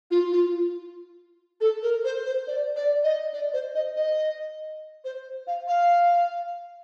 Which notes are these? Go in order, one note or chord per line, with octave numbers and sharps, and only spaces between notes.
F4
F4
A4
A#4
C5
C5
D5
D5
D#5
D5
C5
D#5
D#5
C5
F5
F5